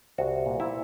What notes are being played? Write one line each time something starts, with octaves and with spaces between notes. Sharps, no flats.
C2 F#4
A#2
E4